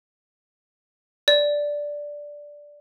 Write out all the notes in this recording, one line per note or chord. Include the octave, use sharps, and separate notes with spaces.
D5